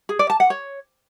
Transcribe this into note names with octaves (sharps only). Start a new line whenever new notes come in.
G#4
D5
A5
F#5
C#5